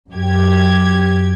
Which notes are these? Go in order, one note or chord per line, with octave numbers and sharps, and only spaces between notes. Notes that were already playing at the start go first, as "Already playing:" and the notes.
F#2 G4 G#6